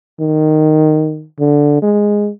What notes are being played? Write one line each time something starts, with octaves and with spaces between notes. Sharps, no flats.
D#3
D3
G#3